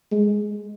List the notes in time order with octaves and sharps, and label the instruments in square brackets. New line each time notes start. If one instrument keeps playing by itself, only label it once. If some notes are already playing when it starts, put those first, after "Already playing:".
[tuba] G#3